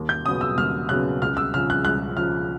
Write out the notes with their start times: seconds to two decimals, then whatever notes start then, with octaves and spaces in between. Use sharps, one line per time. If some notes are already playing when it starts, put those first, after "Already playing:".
Already playing: D#2
0.09 G6
0.25 C#3 F#3 B3 D#6
0.41 E6
0.58 D#2 F6
0.89 C#3 F#3 B3 F#6
1.22 C#2 F6
1.37 E6
1.54 C#3 F3 F6
1.70 F#6
1.85 C#2 F#6
2.17 C#3 F3 F6